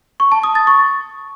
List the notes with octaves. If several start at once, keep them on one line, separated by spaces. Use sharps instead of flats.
C#6
A5
D#6
A6
C#6